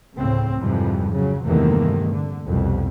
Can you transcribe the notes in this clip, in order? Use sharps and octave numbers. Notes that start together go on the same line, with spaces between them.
D2 A2 C#3 C4
F2 G#2 C3 E3 F3 G3
C#3 F#3
E2 G2 C3 D#3 A3 A#3
D3
C2 F2 B2